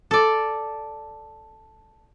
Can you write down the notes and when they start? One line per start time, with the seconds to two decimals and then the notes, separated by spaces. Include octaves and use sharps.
0.11 A4 D5